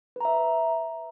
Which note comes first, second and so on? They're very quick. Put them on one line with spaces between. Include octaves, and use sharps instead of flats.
B4 A#5 E5